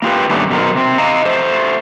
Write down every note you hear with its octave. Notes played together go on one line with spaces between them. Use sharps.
A#3 F4 G4 B4
G2 D#3 G3 A3 B3 C#4
B2 F#3 D#4 A#4 C5
C3 C4
D#5 F5 A#5
A3 C5